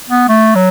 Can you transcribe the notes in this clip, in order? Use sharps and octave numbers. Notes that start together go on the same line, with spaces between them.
B3
A3
F#3